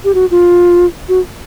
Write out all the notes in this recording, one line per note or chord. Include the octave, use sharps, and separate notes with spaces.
G4
F#4
F4
F#4